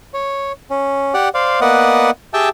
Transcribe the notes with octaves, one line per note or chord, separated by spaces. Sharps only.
C#5
C#4
G4 D5 F#5
C5 D5 F5
A#3 B3 B4 D5 D#5 F#5
G4 G#4 E5 G5 A5